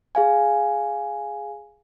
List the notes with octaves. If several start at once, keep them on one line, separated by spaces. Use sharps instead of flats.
G#4 F5 G#5